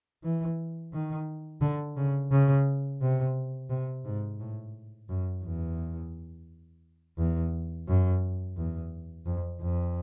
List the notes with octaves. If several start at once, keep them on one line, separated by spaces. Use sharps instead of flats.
E3
D#3
D3
C#3
C#3
C3
C3
G#2
A2
F#2
E2
E2
F#2
E2
F2
F2